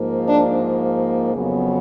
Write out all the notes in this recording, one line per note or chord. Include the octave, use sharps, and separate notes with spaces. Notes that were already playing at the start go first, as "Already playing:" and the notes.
Already playing: G#2 F3 A#3
D4
F2 C#3 F#3 B3